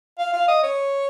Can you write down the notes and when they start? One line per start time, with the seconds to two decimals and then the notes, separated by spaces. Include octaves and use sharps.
0.19 F5
0.33 F5
0.48 D#5
0.63 C#5